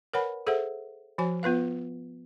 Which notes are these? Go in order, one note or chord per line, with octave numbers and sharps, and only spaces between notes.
A#4 B4 C#5 F#5 G#5 B5
G#4 A4 C5 E5 F#5
F3 F#4 C#5 G#5
B3 F4 B4 F5